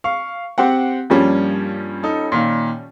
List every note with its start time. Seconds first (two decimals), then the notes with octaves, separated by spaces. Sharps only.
0.04 F5 C#6
0.58 C4 G4 F#5
1.10 G2 F3 G3 A#3 C#4
2.03 D#4 A4
2.32 A#2 D#3 F5